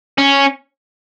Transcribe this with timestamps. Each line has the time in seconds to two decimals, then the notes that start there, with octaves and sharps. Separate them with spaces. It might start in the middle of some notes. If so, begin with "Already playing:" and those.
0.18 C#4